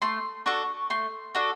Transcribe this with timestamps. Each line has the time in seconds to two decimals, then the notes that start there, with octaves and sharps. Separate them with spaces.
0.02 A3 C6
0.46 D4 F#4 A4 C#6
0.90 A3 C6
1.35 D4 F#4 A4